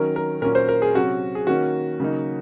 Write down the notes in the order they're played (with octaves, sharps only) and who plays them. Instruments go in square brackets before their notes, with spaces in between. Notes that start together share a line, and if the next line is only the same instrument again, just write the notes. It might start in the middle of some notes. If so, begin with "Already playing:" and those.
Already playing: [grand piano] D#3 F#3 C#4 A#4
A#4
A#2 F#3 C#4 A#4
C5
A#4
G#4
C3 F#3 C#4 F#4
G#4
D#3 A#3 C#4 F#4
C#3 F#3 A#3 D#4